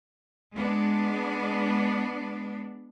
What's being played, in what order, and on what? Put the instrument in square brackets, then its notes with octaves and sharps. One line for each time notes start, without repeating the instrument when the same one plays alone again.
[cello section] G#3 B3 D4